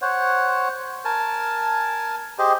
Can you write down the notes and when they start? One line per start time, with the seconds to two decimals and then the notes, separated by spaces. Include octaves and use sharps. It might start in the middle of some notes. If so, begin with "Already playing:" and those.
0.02 C5 C#5 F#5
1.05 A#4 G#5 A5
2.39 G4 G#4 C5 D#5